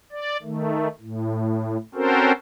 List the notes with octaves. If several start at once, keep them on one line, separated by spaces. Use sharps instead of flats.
D5
D#3 A3
A2
C4 C#4 F#4 A4 A#4 C5